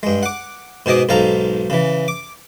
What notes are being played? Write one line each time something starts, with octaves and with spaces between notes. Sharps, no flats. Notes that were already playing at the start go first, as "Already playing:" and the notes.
G2 G#3
F#5 D6
G#2 B2 G#4 D#5 D6
B1 G#2 A4 F5 A#5
C#3 E3
D6